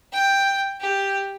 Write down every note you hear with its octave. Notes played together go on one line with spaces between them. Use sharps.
G5
G4